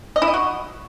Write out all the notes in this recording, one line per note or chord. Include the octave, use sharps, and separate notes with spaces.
D#5
E4
D#5
F#4